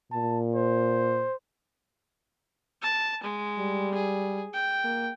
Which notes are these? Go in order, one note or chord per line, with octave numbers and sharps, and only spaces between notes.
A#2 A5
C5
A5
G#3
G3
G#4
G5
A#3